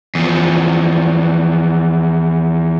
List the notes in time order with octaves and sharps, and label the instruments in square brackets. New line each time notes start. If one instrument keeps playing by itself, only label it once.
[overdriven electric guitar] E2 F3